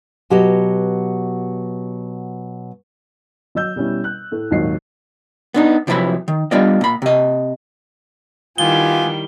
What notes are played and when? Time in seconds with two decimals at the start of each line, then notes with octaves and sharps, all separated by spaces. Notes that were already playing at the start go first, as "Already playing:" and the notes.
0.30 B2 F#3 G4 B4 D#5
3.55 F#3 D#5 E6 G6
3.76 B2 G3 C#4 E4
4.04 F#6
4.32 A2 A3
4.51 G#1 D#2 A#2 F#3 D#5 C7
5.54 B3 D4 D#4
5.87 C3 F3 F#3 E4 B4 B5
6.28 D#3
6.51 G3 B3 D4 F4 D5 D#5
6.81 A#2 B5
7.02 C3 D#5
8.58 D#3 G3 B3 E4 F4 G4 G#5 G7